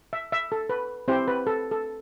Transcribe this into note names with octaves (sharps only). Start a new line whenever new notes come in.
E5
E5
A4
B4
C4 E4 G4 C5
B4
A4
A4